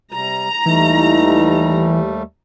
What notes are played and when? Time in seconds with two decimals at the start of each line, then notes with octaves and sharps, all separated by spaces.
0.12 C3 G3 A#5
0.66 D#2 E3 G3 A3 D#4 E4